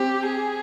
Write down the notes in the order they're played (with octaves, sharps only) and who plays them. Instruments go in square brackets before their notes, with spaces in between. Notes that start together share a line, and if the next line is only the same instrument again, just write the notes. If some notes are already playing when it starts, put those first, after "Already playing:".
Already playing: [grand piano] C4 [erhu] G4
[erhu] G#4